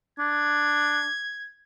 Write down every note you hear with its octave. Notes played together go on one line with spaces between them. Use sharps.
D4 G#6